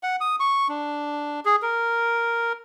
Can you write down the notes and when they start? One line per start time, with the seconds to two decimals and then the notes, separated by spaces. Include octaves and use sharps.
0.03 F#5
0.21 D#6
0.40 C#6
0.69 D4
1.45 G#4
1.62 A#4